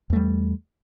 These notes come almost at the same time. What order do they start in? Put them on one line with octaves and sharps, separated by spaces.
E2 A3 G3